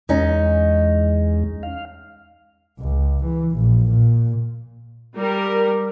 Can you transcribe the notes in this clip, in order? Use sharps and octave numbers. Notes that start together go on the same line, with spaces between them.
E2 G#3 C#4 D#4
F5
C#2
E3
A#1
A#2
G3 A#4